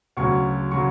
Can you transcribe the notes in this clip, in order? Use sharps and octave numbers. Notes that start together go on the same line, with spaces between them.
D2 C#3 F#3 C#6
C#3 F#3 C#6